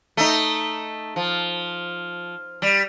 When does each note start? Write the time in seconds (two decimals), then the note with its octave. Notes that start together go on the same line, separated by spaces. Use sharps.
0.17 A3 D#4
1.16 F3
2.62 G3